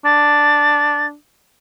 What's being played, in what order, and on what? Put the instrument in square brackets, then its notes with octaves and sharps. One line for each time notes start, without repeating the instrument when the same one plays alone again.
[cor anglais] D4 [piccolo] A6